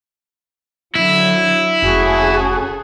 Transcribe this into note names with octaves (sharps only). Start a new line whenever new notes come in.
D3 F#3 E4
F1 C#3 F#4 G#4 A4